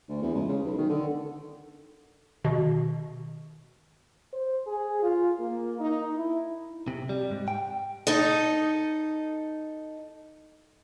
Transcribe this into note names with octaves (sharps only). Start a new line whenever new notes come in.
D2
E2
C#2
C#3
B1
D#3
D3
B2 D#3
C5
G#4
F4
A#3
D#4
E4
C3
G3
G#2
G5
D#4 A4 D#5